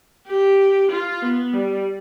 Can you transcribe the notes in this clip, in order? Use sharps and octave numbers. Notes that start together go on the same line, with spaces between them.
G4
F4
B3
G3